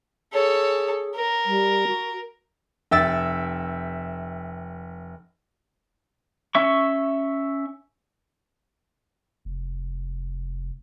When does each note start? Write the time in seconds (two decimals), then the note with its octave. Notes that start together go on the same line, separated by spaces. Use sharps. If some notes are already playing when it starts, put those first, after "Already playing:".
0.33 G#4 A4 C#5
1.15 A#4
1.46 G3
1.87 F#4
2.91 F1 E5 G5 E6 A6
6.55 C#4 E5 C#6
9.45 F1